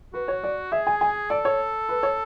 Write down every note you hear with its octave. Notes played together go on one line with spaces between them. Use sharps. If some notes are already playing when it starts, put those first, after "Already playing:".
F#4 B4
C#5
D5
G#4 E5
G#5
G#5
A4 D5
C#5
B4
C#5